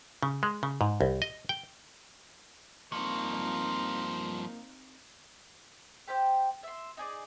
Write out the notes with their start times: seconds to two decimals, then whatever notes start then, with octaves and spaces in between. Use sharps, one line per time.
0.23 C#3
0.43 G#3
0.63 C#3
0.81 G#2
1.01 C2
1.22 D#5
1.49 G5
2.92 G2 F3 A#3 C4 D#4 F5 C#6
6.07 G4 C5 E5 G5
6.63 E5 C6
6.97 D#4 G#4 D5